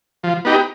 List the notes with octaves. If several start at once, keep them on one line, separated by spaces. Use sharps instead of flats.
F3
B3 D#4 G4